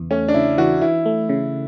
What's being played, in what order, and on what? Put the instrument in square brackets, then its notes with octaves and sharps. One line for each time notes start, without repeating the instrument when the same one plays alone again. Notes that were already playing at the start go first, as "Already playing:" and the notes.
Already playing: [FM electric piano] E2 C#3 E3
[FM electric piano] A3 [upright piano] C#4
[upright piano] D4
[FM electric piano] C#3 [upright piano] E4
[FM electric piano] E3 [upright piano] F#4
[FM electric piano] E3 [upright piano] E4
[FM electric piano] A3
C#3